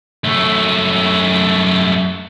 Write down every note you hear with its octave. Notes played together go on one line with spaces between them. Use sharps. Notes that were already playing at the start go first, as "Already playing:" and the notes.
F#2 A3